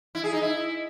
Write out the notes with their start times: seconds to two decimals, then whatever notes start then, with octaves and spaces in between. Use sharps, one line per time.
0.15 E4
0.24 G#4
0.33 D#4
0.42 E4